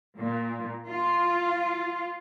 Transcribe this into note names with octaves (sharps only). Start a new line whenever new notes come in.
A#2
F4